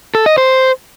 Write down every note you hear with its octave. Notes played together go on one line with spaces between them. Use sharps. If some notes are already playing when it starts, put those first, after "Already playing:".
A4
D#5
C5